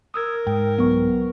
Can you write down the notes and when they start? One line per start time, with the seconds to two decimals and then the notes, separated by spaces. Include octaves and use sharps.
0.14 A#4 D#6 E6 G#6
0.47 G#2 G5
0.79 C2 F#3 B3 C#6